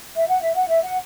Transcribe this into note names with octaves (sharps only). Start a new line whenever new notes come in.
E5
F#5
E5
F#5
E5
F#5